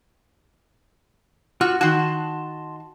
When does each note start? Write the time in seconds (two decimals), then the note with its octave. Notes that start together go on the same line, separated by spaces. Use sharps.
1.61 F4 F#4 F6
1.81 D#3 F#4 A5 C6